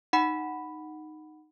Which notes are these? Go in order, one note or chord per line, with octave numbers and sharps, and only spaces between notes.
D#4 F#5 B5